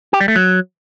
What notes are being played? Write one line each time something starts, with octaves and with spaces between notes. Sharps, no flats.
G4
G3
A3
F#3